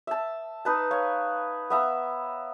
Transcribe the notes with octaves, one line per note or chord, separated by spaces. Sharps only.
E5 A5
D#4 B4 A5
C#5 F5
B3 E5 A#5